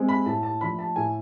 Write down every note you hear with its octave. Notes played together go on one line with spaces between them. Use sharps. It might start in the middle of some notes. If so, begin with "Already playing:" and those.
Already playing: G#3 C4
B5
A2 A5
A5
F3 A3 D4 B5
A5
A2 G#5